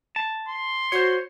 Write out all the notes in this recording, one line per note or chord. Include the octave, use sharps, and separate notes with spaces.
A5
C6
F#4 C5 C#5